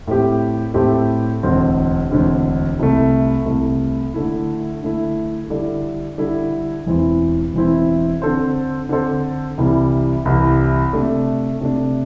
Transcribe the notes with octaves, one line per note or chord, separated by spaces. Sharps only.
A2 A3 C4 G4
A2 A3 C4 G4
E1 D2 D3 C4
E1 D2 D3 C4
C2 C3 A3
C2 C3 A3
D3 A3 E4
D3 A3 E4
D3 G3 E4 A4 D5
D3 G3 E4 A4 D5
E1 E2 E3 C4 E4
E1 E2 E3 C4 E4
D3 C4 A4 C5
D3 C4 A4 C5
C2 C3 E3 G3
C2 C3 E3 G3
C3 A3 D4
C3 A3 D4